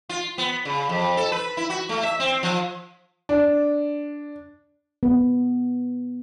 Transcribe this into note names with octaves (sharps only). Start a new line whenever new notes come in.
F4
B3
C#3
F2
A4
B4
E4
F#4
A3
E5
C4
F3
D4
B3